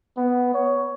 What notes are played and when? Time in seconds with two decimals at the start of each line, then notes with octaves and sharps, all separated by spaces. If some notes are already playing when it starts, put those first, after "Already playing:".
0.17 B3
0.54 C#5